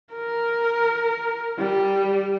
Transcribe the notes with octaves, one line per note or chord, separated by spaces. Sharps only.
A#4
G3